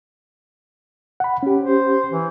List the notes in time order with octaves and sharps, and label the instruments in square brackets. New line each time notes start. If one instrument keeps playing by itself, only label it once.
[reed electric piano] F#5 B5
C#4 G4
[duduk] C5
E3